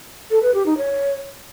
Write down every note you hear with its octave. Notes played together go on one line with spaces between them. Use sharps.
A4
B4
G4
D#4
C#5